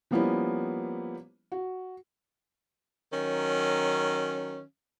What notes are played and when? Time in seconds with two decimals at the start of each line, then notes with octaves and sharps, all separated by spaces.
0.11 F3 G3 A#3 B3 C#4 E4
1.52 F#4
3.13 D#3 F#3 C#4